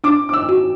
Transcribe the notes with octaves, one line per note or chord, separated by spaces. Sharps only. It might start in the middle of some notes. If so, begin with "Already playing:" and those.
D4 D6
D6
E6
F#4